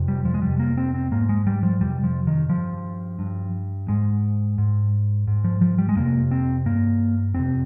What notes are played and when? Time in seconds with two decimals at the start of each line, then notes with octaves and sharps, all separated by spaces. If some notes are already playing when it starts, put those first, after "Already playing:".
Already playing: F2 C3
0.08 G3
0.25 F3
0.34 G#3
0.42 F2 C3 G3
0.59 A#3
0.78 C4
0.94 C4
1.11 G#2 A#3
1.29 G#3
1.47 G3
1.63 F3
1.81 F2 C3 G3
2.03 F3
2.27 D#3
2.49 G2 F3
3.19 G2
3.88 G#2 G#3
4.58 G#2
5.28 G#2
5.44 F3
5.61 F3
5.78 G3
5.89 G#3
5.96 F2 C3 A#3
6.31 C4
6.65 G2 A#3
7.34 F2 C3 C4